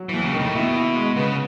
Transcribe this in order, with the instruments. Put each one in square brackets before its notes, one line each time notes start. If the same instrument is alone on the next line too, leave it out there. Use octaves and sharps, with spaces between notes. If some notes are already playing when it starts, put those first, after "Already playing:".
Already playing: [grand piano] F#3
[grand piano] D#2 [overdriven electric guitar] E3
[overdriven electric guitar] C#3
[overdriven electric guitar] A2 [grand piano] D#3
[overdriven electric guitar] B2 [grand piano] E4
[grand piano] E4
G#3
[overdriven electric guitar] C#3 [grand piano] B3